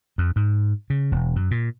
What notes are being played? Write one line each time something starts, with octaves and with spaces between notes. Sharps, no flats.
F2
G#2
C#3
E1
F#2
A#2